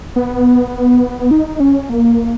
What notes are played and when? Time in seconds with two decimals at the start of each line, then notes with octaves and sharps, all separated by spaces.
0.16 B3
1.31 D#4
1.60 C#4
1.90 A#3